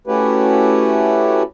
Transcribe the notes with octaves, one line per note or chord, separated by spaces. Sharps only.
A3 C#4 E4 F#4 G4 B4